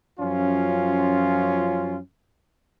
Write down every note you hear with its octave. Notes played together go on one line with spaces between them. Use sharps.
F#2 F3 C#4 F4